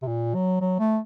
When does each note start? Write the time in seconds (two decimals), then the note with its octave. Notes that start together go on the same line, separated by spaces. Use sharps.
0.03 C3
0.07 A#2
0.35 F#3
0.61 F#3
0.79 A3